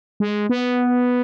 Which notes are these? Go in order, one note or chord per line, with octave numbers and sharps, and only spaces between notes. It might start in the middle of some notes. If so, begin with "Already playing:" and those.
G#3
B3